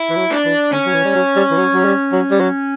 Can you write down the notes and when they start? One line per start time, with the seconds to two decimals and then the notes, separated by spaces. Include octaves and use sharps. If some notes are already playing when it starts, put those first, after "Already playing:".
Already playing: E4
0.09 E3
0.16 F#3
0.31 D4
0.45 E3
0.73 D3 C#4
0.85 F#3
0.93 E3
1.04 G3
1.15 F#3
1.36 G3
1.51 E3
1.57 F#3
1.74 F#3
1.85 G3
2.12 F#3
2.31 G3
2.40 F#3